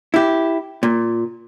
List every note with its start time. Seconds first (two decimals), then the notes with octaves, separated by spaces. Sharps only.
0.14 E4 G4
0.83 A#2